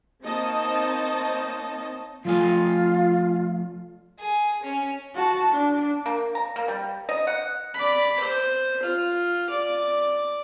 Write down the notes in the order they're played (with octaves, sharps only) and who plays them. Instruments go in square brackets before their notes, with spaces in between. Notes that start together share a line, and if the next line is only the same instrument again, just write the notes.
[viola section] A#3 C4 D#4 C#5 D#5 A5
[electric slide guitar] F3 A3 G#5 [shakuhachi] F4
[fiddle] G#4
C#4
[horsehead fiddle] F#4 A5
D4
[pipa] A#3
A#5
A#3
G3
D#5
F#5
[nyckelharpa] D5 B5
C5
F4
D5